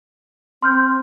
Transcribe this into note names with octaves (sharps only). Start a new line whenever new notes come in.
C4 C6 F6 G6